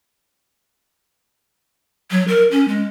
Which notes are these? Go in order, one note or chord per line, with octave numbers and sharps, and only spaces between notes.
F#3
A#4
C#4
G#3